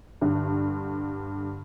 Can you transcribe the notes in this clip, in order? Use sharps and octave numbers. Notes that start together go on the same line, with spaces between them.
G2 D3